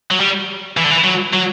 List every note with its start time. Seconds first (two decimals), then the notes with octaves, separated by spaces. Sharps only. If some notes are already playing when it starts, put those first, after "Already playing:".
0.11 F#3
0.20 G3
0.77 E3
0.84 D3
0.91 E3
1.04 F#3
1.33 F#3